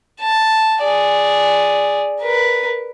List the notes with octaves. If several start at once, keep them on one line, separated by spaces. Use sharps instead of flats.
A5
G#4 D5
A#4 B4